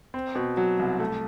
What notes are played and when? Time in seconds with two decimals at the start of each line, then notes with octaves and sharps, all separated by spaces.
0.14 C4
0.35 B2
0.57 F#3
0.79 C2
1.00 A3